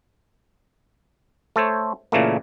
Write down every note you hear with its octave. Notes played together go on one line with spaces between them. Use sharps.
A3 A4 C5 C#5
A#2 C#3 E3 A3 A#3